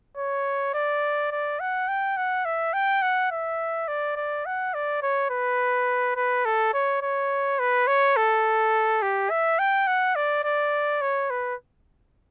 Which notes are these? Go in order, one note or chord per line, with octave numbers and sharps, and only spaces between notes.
C#5
D5
D5
F#5
G5
F#5
E5
G5
F#5
E5
D5
D5
F#5
D5
C#5
B4
B4
A4
C#5
C#5
B4
C#5
A4
G4
E5
G5
F#5
D5
D5
C#5
B4